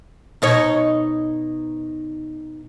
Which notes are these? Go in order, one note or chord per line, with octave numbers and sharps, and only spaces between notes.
B2 D#4 C#5